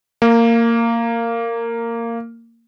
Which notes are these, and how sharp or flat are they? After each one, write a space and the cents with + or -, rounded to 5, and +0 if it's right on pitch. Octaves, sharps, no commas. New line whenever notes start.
A#3 -15